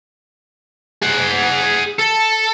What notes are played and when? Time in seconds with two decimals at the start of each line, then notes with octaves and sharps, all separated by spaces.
1.02 G#4 F#5
1.99 A4